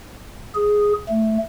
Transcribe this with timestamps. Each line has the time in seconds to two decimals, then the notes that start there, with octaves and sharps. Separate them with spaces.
0.55 G#4
1.09 A3